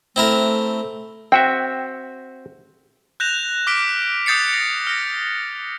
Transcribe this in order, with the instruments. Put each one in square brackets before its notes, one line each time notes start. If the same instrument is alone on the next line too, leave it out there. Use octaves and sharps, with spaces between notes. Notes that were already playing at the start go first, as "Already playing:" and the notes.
[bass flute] A3 [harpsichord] C4 E4 A#4
[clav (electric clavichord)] C4 F#4 E5 [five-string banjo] G5
[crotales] F#6 G6 A#6 E7 F7
D6 F6 B6 D7
D#6 G6 A6 C7 C#7
A#6
F6 A#6